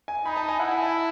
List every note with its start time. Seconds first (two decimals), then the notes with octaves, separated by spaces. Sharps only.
0.08 G#5
0.25 D#4 B5
0.37 A5
0.49 G#5
0.59 E4 F#5
0.71 G#5
0.82 A5